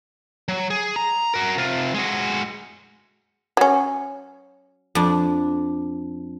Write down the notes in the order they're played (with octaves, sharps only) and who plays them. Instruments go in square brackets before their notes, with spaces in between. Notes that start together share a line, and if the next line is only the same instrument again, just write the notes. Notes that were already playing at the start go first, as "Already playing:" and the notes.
[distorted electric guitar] F#3
G#4
A#5
F#4 A#4
C3 F4
G#3 F#4
[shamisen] F#3 C#4
[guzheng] F2 D4